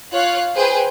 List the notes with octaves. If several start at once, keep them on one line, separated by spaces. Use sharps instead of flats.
F4 C#5 F5 F#6
G#4 B4 C5 G5